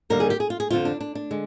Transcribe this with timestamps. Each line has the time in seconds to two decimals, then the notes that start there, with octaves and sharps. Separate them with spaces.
0.10 D#2 D3 G3 A#3 A#4
0.20 G#4
0.30 G4
0.40 G#4
0.50 F4
0.60 G#4
0.70 F2 D3 F3 F4
0.85 D4
1.01 D4
1.15 D4
1.31 D3 G#3